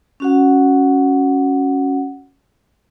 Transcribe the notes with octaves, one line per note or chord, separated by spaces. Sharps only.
C#4 F#4 F#5